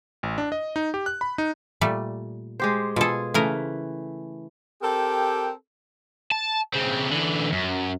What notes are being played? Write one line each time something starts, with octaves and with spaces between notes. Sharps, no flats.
A1
D4
D#5
D#4
G4
F#6
B5
D#4
A#2 G3 A3
G#3 G4 C5
B2 F4 G#4 A4
C#3 E3 A3 A#4
C4 G4 A4 A#4 G5
A5
C#3 C4
D3 E3
F#2